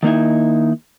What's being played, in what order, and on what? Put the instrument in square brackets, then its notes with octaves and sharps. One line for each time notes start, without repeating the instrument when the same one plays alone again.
[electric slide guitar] D#3 A#3 D#4 E4